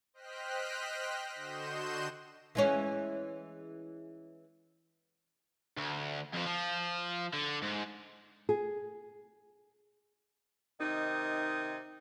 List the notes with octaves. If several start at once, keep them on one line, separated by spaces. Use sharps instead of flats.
C5 D#5 G5 F6 F#6 B6
D3 F#4 D#5 C6 G6 E7
E3 G#3 C#4
D2
F2 F3
F3
D3
G#2
G#4
C3 D#3 D#4